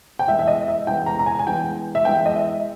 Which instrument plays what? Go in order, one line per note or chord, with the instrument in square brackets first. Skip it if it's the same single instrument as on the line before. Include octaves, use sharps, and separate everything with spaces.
[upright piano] G5
E3 G#3 B3 E5
E5
D#5
E5
E3 G#3 B3 G5
A#5
A#5
G#5
G#5
E3 G#3 B3 G5
E5
E3 G#3 B3 G5
D#5
E5